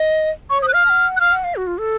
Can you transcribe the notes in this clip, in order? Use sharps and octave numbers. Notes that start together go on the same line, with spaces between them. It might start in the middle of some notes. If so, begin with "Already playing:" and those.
Already playing: D#5
C#5 C#6
C5 D#6
F#6
F5 F6
A5
F#5
F#6
F5 F6
F#5
F5
F#4
F4
A4